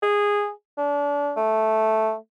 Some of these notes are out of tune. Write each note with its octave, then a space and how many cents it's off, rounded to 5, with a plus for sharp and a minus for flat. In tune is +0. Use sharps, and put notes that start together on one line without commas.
G#4 -15
D4 -30
A3 -5